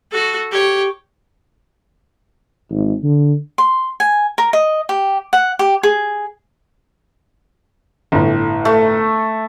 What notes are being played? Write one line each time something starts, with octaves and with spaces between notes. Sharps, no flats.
F#4 A4
G4 C#5
G#1
D3
C6
G#5
A#4
D#5
G4
F#5
G4
G#4
G1 A2
A3